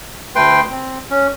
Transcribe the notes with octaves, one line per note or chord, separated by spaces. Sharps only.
D2 A3 B4 G5 C6
C4
C#4